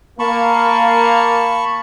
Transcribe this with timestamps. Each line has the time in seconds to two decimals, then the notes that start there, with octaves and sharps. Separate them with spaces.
0.19 A#3 A5 B5 C#6